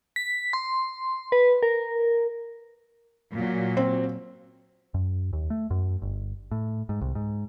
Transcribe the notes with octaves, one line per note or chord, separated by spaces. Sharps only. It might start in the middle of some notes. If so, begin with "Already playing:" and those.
B6
C6
B4
A#4
A#2 F#3
C4
F#2
D#2
A3
F#2
G1
A2
G#2
C2
G#2